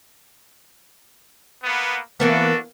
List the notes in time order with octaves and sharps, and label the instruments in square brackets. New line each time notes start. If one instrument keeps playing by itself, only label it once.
[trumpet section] A#3 B3
[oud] E3 A#3 B3 [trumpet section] D4 F#4 A4